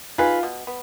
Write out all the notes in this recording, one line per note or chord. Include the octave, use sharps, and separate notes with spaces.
D#4 F4 G#4 B4
B2
B3